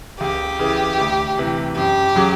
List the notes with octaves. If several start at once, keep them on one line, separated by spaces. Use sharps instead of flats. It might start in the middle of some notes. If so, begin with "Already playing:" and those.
C#2 G4
C#3 E3
D2
C3 E3
F#2 G4
C#3 F#3